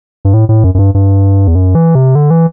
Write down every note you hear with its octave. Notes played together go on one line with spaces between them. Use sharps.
G2
A2
A2
F#2
F#2
G2
G2
E2
F#2
E3
C3
D3
E3